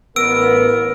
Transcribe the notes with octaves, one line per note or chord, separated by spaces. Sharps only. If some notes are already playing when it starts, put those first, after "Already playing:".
A1 B3 A#4 E6 D7